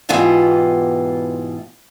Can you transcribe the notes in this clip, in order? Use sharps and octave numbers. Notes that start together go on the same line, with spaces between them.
G#2 B2 E3 B3 F4 G4